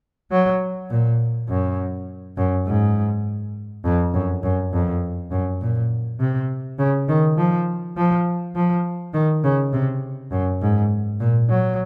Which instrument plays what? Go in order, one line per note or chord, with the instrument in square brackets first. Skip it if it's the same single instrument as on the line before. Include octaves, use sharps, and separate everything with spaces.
[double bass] F#3
A#2
F#2
F#2
G#2
F2
F#2
F#2
F2
F#2
A#2
C3
C#3
D#3
F3
F3
F3
D#3
C#3
C3
F#2
G#2
A#2
F#3